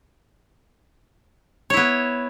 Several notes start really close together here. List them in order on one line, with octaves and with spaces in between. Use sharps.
C#5 E4 B3